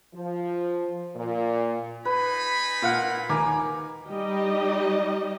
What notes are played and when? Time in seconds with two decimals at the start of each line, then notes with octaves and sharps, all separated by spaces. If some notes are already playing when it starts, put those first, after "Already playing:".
0.15 F3
1.15 A#2
2.05 D#4 B4 G#5 B5
2.82 A#2 F5 F#5
3.29 D#2 A#4 G#5 D6
4.08 G3 D#4 G4 D#5